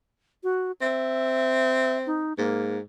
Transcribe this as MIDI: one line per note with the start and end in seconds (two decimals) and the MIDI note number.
0.44 0.72 66
0.81 2.29 60
0.81 1.98 76
2.06 2.33 63
2.38 2.81 44
2.38 2.79 58